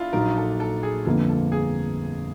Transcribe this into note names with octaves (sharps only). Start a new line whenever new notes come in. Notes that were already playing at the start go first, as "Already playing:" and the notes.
Already playing: D4 E4 F4
A#1 A#2 F#3 A#3 D#4 A#4
A4
A4
G#4
G1 F2 D3 F3 A#3 A4
A4
G#4